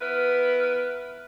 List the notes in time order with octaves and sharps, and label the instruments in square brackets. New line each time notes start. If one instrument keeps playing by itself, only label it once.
[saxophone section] B3 E4 A#4 B4